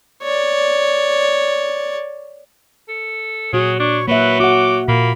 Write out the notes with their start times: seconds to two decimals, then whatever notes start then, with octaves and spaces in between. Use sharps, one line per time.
0.22 C#5 D5
2.88 A4
3.53 A#2 F#3 F#4 G#4
3.79 D4 C#5
4.08 F#3 A#3 B4 E5
4.40 F#4 F#5 D6
4.88 A#2 A#3 B5